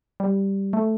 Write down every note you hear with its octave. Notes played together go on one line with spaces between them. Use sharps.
G3
A3